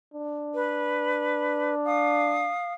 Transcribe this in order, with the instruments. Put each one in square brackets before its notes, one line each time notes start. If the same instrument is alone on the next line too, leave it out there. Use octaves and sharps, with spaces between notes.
[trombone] D4
[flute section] B4
F5 D#6